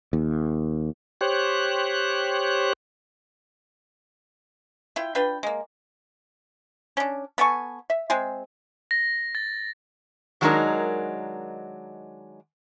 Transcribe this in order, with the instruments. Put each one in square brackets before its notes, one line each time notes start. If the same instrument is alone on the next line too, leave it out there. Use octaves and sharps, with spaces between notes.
[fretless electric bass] D#2
[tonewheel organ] G4 C5 C#5 F#6
[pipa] E4 F4 G5
D4 F4 B4 G5
G#3 A#3
C#4 D4
B3 A4 G#5 C#6
E5
G#3 C4 G#4
[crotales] A#6
A6
[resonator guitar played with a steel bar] D#3 F#3 G#3 D4 D#4 A#4